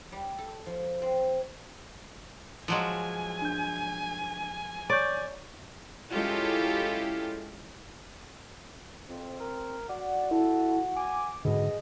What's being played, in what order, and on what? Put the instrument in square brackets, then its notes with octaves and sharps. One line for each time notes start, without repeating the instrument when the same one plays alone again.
[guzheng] G3
A4
F3
C4
[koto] F3 F#3 G#3 [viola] G#5
[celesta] D4 G6
[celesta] C#5 C#6 G6 [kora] D5
[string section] G#3 C#4 E4 F4 G4 A4
[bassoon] F2 [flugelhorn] C4
[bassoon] A#4
[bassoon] F#4 [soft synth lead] D5 [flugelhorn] F#5
[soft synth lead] E4 [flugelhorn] A4
[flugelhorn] G#5 [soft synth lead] D6
[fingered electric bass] G#2 D3 [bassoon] B2 [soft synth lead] G#4 [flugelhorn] D#5